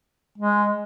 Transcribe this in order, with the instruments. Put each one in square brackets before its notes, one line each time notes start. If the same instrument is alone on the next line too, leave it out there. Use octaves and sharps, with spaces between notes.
[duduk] G#3